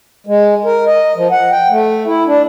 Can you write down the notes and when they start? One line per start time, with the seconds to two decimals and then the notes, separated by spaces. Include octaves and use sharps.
0.27 G#3
0.65 A#4
0.86 D#5
1.16 F3
1.31 F#5
1.52 G5
1.70 A3
2.07 E4
2.26 D4